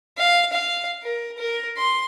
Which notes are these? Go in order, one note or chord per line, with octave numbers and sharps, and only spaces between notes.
F5
F5
A#4
A#4
C6